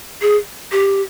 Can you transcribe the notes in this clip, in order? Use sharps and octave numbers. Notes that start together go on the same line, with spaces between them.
G#4
G4